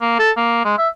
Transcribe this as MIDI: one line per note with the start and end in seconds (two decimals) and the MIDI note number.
0.01 0.15 58
0.19 0.31 69
0.37 0.61 58
0.65 0.74 56
0.78 0.88 76